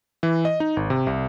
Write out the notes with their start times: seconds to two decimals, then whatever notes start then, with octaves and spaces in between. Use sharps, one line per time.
0.23 E3
0.45 D#5
0.60 D#4
0.77 G#1
0.90 C3
1.07 C2